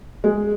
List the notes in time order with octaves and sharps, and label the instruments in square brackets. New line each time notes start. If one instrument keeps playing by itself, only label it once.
[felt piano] G#3